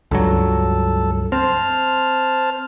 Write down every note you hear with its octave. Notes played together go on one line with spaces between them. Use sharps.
C#2 G2 F#3 A4
C4 C5 A5 F6